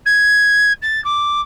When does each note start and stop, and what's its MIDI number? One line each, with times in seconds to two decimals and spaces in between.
0.06 0.72 92
0.82 1.02 93
1.04 1.41 86